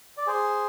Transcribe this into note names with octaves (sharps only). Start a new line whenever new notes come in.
D5
G#4 C5